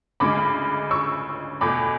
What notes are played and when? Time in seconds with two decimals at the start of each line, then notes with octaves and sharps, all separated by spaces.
0.20 D2 C#3 G#3 B5 D6
0.91 C#6 E6
1.61 E2 B2 A3 B5 D6